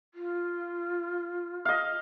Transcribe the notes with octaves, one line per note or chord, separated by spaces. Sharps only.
F4
D#5 F5